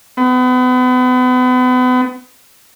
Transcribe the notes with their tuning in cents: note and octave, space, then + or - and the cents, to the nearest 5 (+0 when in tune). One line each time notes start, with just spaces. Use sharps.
B3 +35